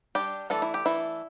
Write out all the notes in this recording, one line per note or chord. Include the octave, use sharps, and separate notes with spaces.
G3 D4 G4
E3 A3 D4 A4
E4
G4
E3 A3 D4 E4